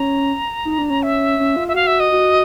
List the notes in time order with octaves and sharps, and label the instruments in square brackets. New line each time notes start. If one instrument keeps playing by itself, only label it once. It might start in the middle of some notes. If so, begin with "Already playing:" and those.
Already playing: [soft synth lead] C#4 [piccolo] A#5
[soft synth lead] D#4
D4
C#4
[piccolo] E5
[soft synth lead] C#4
F4
[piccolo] E5
[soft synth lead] F#4 [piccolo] F5
[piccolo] E5
D#5
[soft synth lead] F#4